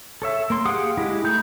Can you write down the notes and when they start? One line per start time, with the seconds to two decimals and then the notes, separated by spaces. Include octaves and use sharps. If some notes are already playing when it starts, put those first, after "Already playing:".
0.22 A4 C#5 E5
0.50 A#3 C6
0.65 G4 G#4 F5 F#5 D#6
0.97 G#3 E4 G4 D#5
1.24 A3 D#4 B5 G6